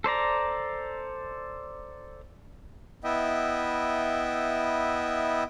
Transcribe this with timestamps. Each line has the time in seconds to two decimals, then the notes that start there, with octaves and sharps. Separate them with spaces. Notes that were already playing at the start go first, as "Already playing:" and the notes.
0.04 A4 C5 D5 A#5
3.04 B3 E4 D#5 E5 G5